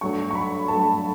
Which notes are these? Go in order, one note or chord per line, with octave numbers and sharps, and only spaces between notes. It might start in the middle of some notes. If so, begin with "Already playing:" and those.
G2 F#3 A3 C#6
C#6
B5
G2 F#3 A3 A5